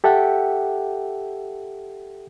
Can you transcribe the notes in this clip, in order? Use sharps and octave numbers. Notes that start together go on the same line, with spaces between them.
G4 A4 E5 F#5 G5